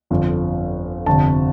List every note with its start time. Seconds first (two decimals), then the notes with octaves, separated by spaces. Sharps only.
0.10 G1 F2 D3 F3
1.06 G1 F2 C3 A5